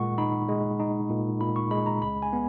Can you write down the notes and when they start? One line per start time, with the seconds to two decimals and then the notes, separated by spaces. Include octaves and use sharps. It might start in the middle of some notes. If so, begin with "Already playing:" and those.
Already playing: A#2 G#3 F#5 C#6
0.18 D#4 B5
0.49 G#3
0.79 D#4
1.10 A#2
1.41 A#2 B5
1.56 C#6
1.71 G#3 B5
1.86 A#5
2.02 C#2 B5
2.22 G#5
2.33 B3